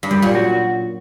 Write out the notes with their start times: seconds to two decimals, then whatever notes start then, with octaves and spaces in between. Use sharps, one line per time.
0.03 G2
0.11 F#2 G3
0.22 A#2
0.35 F#4